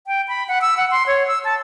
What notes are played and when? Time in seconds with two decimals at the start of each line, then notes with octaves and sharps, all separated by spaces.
0.07 G5
0.28 B5
0.48 F#5
0.62 E6
0.77 F#5
0.91 C6
1.07 C#5
1.28 E6
1.44 A5